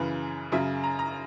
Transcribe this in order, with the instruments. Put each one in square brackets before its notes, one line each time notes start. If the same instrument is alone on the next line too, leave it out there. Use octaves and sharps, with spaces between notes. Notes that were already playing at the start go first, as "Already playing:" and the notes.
Already playing: [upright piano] F#2 C#3 E3
F#2 C#3 F#3 E5
A#5
A#5